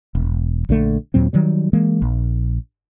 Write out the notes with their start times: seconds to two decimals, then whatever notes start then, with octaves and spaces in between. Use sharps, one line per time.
0.15 E1
0.69 A#1 D3 D#3 A3
1.14 D#2 A#2 F#3 C4
1.33 D#3 F#3 G3
1.73 E3 G#3 A#3
2.02 A#1